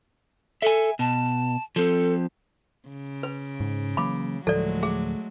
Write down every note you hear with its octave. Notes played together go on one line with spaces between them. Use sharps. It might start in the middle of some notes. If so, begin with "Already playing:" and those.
A4 E5 G#5
B2 A5
F3 C4 A4
C#3
B4
G#2
E3 F#3 A#3 B5 D6
D2 A2 F3 F#3 G#3 A3 A4 D5
G#4